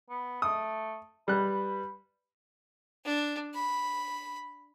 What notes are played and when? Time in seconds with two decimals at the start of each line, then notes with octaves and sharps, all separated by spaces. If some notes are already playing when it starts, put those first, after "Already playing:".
0.09 B3
0.42 A3 D#6
1.28 G3 B4 F#6
3.05 D4
3.54 B5